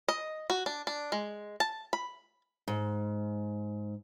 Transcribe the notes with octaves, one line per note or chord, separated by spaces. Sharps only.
D#5
F#4
D4
D4
G#3
A5
B5
G#2